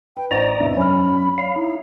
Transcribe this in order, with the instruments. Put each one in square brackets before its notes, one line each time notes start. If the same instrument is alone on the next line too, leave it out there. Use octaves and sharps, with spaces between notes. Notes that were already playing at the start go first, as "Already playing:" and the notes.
[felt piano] B4 [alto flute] G5
[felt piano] A1 C#6 [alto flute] C5 [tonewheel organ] D5 D#5 A#5
[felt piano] E2 G#2 C3 [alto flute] E5
[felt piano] F#2 F6 [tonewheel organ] F#3 C#4 [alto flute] B5
[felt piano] C#5 [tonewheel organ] F5
[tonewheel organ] D#4 [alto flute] E4